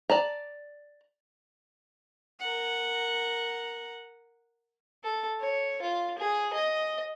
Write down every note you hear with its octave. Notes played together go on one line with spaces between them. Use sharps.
D5 A5 A#5
A#4 F#5
A4
C#5
F4
G#4
D#5